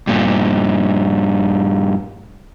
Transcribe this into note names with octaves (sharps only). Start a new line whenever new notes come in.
G2 A#2